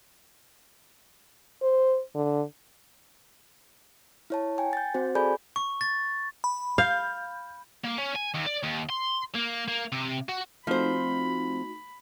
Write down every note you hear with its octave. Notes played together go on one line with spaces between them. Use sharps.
C5
D3
E4 C#5 A5
G5 G#5
G6 A6
C4 F#4 C5
G#4 A4 D5 G#5 B5 G6
C#6
A6
B5
F5 G6
A#3
C#4
G#5
D#2
D5
D#2
C6
A#3
A#3
C3
F#4
F3 A3 C4 D#4 F#4 C5 B5